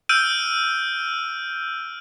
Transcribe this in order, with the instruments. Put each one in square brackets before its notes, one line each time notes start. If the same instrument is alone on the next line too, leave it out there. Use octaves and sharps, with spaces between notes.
[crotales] E6 F6 G6 D7 D#7